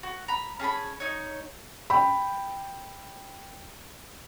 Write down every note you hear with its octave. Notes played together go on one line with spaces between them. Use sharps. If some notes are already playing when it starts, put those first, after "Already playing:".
F#4
A#5 B5
C#4 G#4 A5 B5
D#4 C#5
G5 B5